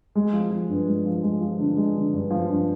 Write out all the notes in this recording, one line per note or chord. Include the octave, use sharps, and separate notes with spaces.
G#3
F3
F3
G2
G#3
F3
G#3
F3
D3
G#3
D3
G2
F3
G2